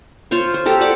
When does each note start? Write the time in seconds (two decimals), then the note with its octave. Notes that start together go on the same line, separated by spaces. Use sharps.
0.31 F4 C5 C#5
0.54 C5
0.65 G4 A4 A#5
0.81 D5 F#5 D6